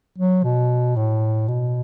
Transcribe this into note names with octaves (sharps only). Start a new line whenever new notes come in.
F#3
B2
A2
B2